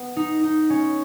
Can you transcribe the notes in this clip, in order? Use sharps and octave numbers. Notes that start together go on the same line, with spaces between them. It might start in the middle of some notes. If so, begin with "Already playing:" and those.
Already playing: B3
D#4
D#4
C#4